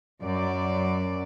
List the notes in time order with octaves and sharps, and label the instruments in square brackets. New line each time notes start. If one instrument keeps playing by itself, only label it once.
[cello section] F#2 D5